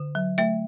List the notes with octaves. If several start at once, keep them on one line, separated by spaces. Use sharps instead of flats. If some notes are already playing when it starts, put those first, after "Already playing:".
Already playing: D3
F#3
A3 E5